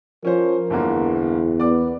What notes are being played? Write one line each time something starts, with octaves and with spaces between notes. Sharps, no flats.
F3 C#4 A#4 C5
G1 E2 D3 A#3
B3 D5 D6